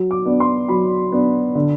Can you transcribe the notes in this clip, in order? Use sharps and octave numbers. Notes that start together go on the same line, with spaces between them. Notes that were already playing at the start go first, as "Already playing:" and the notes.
Already playing: F#3
D6
B3 D4
C6
F#3 B5
B3 D4
D3